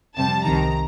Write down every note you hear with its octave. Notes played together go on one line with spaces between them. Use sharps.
F2 C3 G3 A5
C2 C3 D#3 A#5